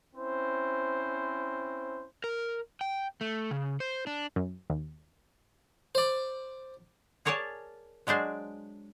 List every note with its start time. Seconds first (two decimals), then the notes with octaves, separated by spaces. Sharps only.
0.14 C4 C#4 E4 C5
2.24 A#4
2.81 G5
3.21 A3
3.51 C#3
3.80 C5
4.07 D4
4.36 F#2
4.70 D#2
5.95 C5 D5
7.25 G#4 A#4 C#5 D5 G#5 A5
8.07 F#3 G#3 D4 C5